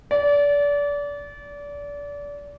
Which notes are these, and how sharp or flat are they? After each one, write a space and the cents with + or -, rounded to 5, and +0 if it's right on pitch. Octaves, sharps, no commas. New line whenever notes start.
D5 -30